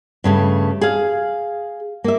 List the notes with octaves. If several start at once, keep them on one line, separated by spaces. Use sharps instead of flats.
G2 C#3 A3
G#4 F5
A#3 E5